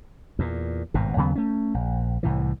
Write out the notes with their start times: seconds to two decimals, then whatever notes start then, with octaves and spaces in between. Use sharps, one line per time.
0.39 E2 A#2
0.94 G#1 G2 B2
1.17 D#2 C#3 F#3 B3
1.35 A3 C#4
1.74 A#1
2.23 C2 A2 E3